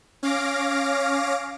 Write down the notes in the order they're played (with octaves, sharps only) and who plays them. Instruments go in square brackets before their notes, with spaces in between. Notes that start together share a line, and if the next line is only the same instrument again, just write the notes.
[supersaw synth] C#4 F5 D6 A#6 D7